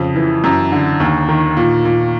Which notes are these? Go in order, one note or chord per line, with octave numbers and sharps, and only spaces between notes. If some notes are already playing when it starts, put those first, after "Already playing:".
Already playing: F2 C#3
E3
F#2
D3
D#2
D#3
A#2
A#2